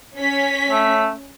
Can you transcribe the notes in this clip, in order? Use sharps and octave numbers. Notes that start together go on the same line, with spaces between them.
C#4 B6
A3